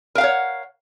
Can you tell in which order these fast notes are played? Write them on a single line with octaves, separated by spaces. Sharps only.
A#4 F5 F#5 C#5